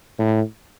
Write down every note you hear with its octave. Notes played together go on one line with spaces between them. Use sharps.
A2